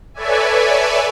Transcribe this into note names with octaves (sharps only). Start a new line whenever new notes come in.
A4 B4 C#5 D5 E5 G#5